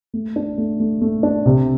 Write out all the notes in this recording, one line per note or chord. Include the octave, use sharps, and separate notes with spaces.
A3
D4
A3
A3
A3
D4
C3